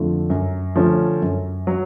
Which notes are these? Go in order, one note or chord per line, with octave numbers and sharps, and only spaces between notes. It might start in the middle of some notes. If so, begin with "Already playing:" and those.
Already playing: F2 D3 F3 A3
F#2
D3 F3 A3 C#4
F#2
F#3